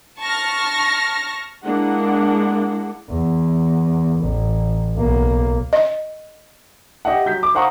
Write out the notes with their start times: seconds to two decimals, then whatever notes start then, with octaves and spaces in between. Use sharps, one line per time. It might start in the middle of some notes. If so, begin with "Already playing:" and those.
0.20 A5 C#6 F6 A#6
1.64 G#3 A#3 D4 E4 G#4 F#5
3.10 E2
4.19 A1
4.96 B1 A#3
5.73 D#5
7.05 G4 D#5 E5 F#5
7.26 F#3 G6 B6
7.43 D6
7.55 C5 F5 F#5 A#5 C#6 D#6